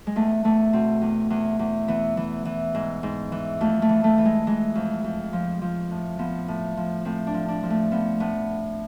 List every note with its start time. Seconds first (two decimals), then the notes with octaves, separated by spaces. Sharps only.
0.07 G#3
0.16 E2 A3
0.44 E2 A3
0.73 B2 C4
1.01 E2
1.30 E2
1.59 E2
1.88 E3 B3
2.17 E3
2.45 E3
2.75 G#2
3.03 G#2
3.32 E3
3.60 F2 A3
3.82 A3
3.89 E3
4.04 A3
4.18 E3
4.25 G#3
4.47 E3 G#3
4.75 F2
5.04 F2
5.33 F3
5.62 F3
5.90 A2
6.19 F3 B3
6.48 A2
6.77 F3
7.05 A2 C4
7.27 D4
7.34 F3
7.48 D4
7.63 F3
7.70 A3
7.91 F3 B3
8.20 A2 B3